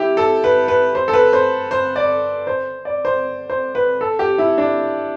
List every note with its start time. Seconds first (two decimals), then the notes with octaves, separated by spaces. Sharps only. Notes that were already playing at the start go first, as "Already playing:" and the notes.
Already playing: E4 G4
0.17 A4
0.44 B4
0.68 B4
0.95 C5
1.08 A4
1.13 B4
1.33 C5
1.71 C5
1.96 D5
2.47 C5
2.85 D5
3.05 C5
3.50 C5
3.75 B4
4.01 A4
4.19 G4
4.38 E4
4.58 D4